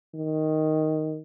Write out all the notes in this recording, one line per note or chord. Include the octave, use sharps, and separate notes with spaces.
D#3